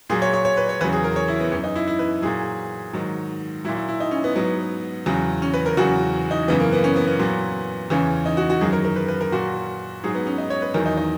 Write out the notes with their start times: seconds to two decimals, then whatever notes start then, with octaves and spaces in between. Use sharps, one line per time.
0.09 A#2 F#3 G#4
0.22 C#5
0.34 C#5
0.45 C#5
0.57 B4
0.69 C#5
0.81 E2 C#3 F#3 B4
0.93 G#4
1.04 A#4
1.16 C#5
1.28 E4
1.40 B3
1.52 F#2 E3 C#4
1.64 D#4
1.75 E4
1.87 E4
1.99 B4
2.22 A#2 F#3 G#4
2.93 G#2 D#3 F#3
3.65 F#3 E4
3.68 A#2
3.76 E4
3.88 E4
4.00 D#4
4.11 C#4
4.24 B3
4.36 G#2 F#3 B3
5.06 E2 C#3 F#3
5.42 C#4
5.54 B4
5.66 A#4
5.77 E2 C#3 F#3 F#4
6.31 D#4
6.48 F#2 C#3 E3 B3
6.60 A#3
6.72 B3
6.84 C#4
6.96 B3
7.07 B3
7.19 A#2 F#3
7.90 E2 C#3 E3 C#4
8.26 D#4
8.37 F#4
8.50 F#4
8.61 F#2 D#3 F#3 G#4
8.73 A#4
8.85 A#4
8.96 B4
9.08 B4
9.21 A#4
9.32 A#2 F#3 F#4
10.03 G#2 F#3 G#4
10.15 B3
10.27 C#4
10.38 D#4
10.50 C#5
10.62 B4
10.74 E2 D#3 F#3 A#4
10.86 D#4
10.97 D#4